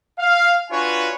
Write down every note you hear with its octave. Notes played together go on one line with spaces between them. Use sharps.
F5
D4 F4 F#4 B4 C#5 G#5